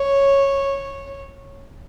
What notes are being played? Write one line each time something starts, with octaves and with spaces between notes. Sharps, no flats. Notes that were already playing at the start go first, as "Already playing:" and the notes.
Already playing: C#5